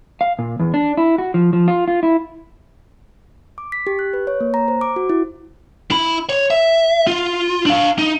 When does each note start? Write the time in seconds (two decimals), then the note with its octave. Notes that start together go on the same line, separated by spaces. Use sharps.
0.21 F5
0.39 A#2
0.59 E2
0.74 D4
0.97 E4
1.18 F#4
1.34 F3
1.53 F3
1.68 F4
1.88 F4
2.03 E4
3.58 D6
3.72 B6
3.87 G4
3.99 F#6
4.13 B4
4.27 C#5
4.41 A#3
4.54 A#5
4.68 C5
4.81 D6
4.96 F#4
5.10 E4
5.91 E4 B5
6.29 C#5
6.51 E5
7.07 F4
7.66 D4 F5
7.99 D#4